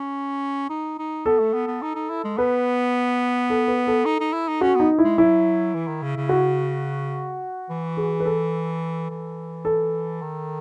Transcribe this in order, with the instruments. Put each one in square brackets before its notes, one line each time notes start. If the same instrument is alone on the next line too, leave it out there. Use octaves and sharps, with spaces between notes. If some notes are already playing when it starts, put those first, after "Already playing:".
Already playing: [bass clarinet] C#4
D#4
D#4
[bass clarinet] B3 [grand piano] A4
[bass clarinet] A3
B3
B3
D#4
D#4
E4
G#3
[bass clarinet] B3 [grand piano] B4
[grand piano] A4
B4
A4
[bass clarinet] D#4
D#4
E4
D#4
[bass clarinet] C#4 [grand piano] F#4
[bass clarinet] B3 [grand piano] D#4
[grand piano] E4
[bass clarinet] G#3
[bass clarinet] F#3 [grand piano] E4
[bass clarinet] E3
D#3
C#3
C#3
[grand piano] F#4
[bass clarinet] E3
[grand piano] G#4
B4
A4
[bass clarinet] E3
[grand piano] A4
[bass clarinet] D#3